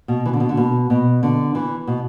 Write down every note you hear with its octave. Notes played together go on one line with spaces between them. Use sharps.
B2
E3
D3
B2
D3
B2
B2
D3
E3
B2